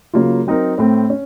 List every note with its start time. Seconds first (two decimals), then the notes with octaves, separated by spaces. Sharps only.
0.14 C#3 F#3 A#3 F4
0.47 F#3 C4 D#4 A#4
0.78 A2 A3 C4
1.10 C#4